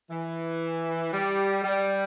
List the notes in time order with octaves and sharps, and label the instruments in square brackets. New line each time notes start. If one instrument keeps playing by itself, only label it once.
[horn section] E3
G3
G3